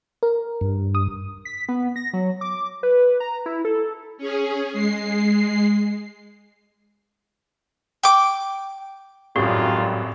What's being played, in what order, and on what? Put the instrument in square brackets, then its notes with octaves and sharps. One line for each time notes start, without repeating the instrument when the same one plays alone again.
[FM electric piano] A#4
[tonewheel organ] G2
[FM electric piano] D#6
[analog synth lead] B6
B3
A#6
F#3
D6
B4
A#5
E4
A4
[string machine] C#4 G#4
G#3 C7
[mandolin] G5 D6
[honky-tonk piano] G#1 F#2 [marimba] A2 [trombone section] D#3 G3 F4 [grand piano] F#3 G4